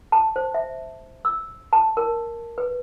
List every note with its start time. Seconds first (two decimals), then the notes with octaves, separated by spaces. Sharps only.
0.12 A5
0.36 C5
0.54 E5
1.25 E6
1.73 A5
1.97 A#4
2.58 B4